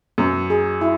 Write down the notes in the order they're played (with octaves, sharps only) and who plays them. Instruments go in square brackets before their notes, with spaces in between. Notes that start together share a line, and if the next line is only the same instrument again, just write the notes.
[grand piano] F#2 [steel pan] B3
[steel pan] G#4
E4